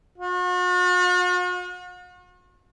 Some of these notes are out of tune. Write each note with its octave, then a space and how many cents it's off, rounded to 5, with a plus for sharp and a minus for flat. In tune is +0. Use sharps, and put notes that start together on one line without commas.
F#4 -45